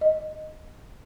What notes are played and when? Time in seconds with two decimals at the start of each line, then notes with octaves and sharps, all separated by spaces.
0.01 D#5